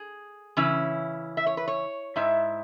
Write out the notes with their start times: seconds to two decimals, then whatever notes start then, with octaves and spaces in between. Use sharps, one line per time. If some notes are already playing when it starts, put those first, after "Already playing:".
Already playing: G#4
0.57 C#3 E3 C#4 E4
1.37 E5
1.47 C#5
1.57 B4
1.68 C#5
2.16 G#2 G#3 E4 E5